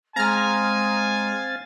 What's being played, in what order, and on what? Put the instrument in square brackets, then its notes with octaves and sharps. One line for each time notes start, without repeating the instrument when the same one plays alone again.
[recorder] G#3 [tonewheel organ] C4 F5 A6 [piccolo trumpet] G#5 [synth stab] A#5 F6